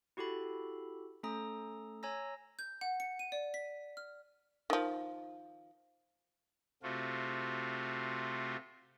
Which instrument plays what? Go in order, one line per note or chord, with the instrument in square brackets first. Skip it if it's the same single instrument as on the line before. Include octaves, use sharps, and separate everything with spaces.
[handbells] E4 F#4 G4 A4 B5
A3 C#4 A4 A#5 D#6
C#5 G#5 A#5 E6 A#6
[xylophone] G6
F#5
C#7
D#7
D5
B6
F6
[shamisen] D#3 F3
[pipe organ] C3 A3 F4 F#4